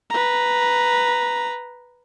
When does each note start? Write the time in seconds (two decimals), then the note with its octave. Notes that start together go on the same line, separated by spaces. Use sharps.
0.10 B4 A#5